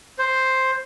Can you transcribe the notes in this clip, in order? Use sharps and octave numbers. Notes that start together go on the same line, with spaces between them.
C5